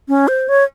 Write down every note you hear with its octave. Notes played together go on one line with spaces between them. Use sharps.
C#4
C5
C#5